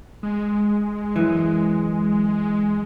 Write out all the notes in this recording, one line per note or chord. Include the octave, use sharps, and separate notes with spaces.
G#3
F#2 E3